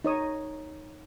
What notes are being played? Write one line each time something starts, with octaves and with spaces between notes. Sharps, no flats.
D#4 C#5 D#6